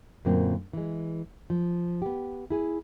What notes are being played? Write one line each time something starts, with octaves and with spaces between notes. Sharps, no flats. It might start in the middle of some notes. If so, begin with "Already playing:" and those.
F#2 A#2 D3 A#3 C4
E3 G#3
F3
B3 G4
E4 G#4 G#5